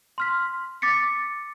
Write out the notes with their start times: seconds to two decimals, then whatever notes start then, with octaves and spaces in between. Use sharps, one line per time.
0.18 C6 F6 B6
0.82 D6 A6 B6 C#7